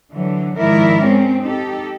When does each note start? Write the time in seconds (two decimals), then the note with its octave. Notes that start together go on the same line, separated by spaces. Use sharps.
0.10 D3 E3 F#3
0.57 G#2 D#3 F3 E4 A#4 D5
1.01 G#3 C4 C#4
1.41 D#4 G4 A4